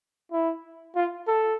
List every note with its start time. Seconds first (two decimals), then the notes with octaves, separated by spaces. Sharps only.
0.32 E4
0.96 F4
1.27 A4